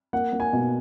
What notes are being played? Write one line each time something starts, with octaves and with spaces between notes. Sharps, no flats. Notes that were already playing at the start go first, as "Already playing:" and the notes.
A#3 F#5
A#3
G#5
B2